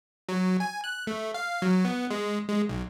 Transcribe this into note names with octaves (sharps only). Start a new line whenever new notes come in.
F#3
G#5
F#6
A3
F5
F#3
B3
G#3
G#3
B1